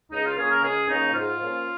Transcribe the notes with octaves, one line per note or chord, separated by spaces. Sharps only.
C#2 D#4
F4
C#3 A#3 C#4 G#4
A#4
C#2 G#4
C#3 A#3 C#4 D#4
G#2 F4
F3 A#3 C#4